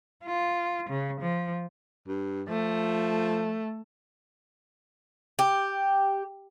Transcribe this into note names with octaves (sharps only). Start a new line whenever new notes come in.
F4
C#3
F3
G2
F3 A3
G4